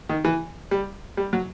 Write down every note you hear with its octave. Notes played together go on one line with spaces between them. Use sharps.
D#3
E3
G3
G3
F#3